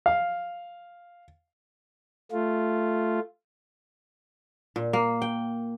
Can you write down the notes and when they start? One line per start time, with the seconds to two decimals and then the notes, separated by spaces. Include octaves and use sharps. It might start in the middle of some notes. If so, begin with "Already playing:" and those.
0.06 F5
2.32 A3 F4
4.76 A#2
4.93 A#3
5.22 G5